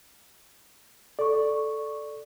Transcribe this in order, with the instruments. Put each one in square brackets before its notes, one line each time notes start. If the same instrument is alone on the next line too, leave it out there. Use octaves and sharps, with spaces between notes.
[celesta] A4 C#6 [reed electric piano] D5